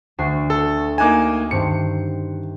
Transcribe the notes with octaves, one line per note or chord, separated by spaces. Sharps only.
D2 F#4 C7
A4
A#3 D#4 G#5 D6 F#6 E7
G2 D#3 C4 C#7